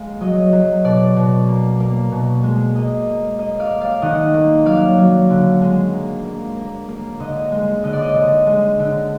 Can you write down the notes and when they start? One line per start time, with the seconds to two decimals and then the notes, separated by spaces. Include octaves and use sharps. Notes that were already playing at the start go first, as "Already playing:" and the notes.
Already playing: G#3 A#3 F5
0.21 F#3 D#5
0.52 F#3
0.84 B2 D5
1.17 B2
1.48 A#3
1.80 A#3
2.12 B2
2.43 G#3
2.75 A#3 D#5
3.07 A#3
3.39 A#3 D#5
3.60 D5 F5
3.71 A#3
3.81 D5 F5
4.02 D#3 D#5 F#5
4.34 A#3
4.65 F#3 D5 F5
4.98 F#3
5.30 D3
5.61 G#3
5.93 A#3
6.25 A#3
6.57 A#3
6.89 A#3
7.20 D3 D#5
7.52 G#3
7.84 D3 D#5
7.93 D5
8.02 D#5
8.16 D3
8.47 G#3
8.79 D3